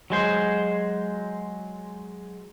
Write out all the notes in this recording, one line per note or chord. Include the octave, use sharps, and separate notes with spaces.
F#3 G#3 C5